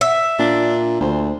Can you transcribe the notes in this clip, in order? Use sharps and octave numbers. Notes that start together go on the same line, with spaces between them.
E5
A#2 D4
D2 C5